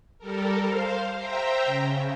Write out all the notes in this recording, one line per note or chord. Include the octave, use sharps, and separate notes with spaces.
G3 A4 A#4
C5 F5
C5 E5 G5 A#5
C#3